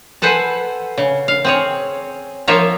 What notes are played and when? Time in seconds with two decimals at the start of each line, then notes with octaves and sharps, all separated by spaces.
0.22 A4 B4 C5 F#5 G#5
0.98 C#3
1.28 F5
1.45 C4 G#4 C#5
2.48 F3 A#3 F4 C#5 E5 A#5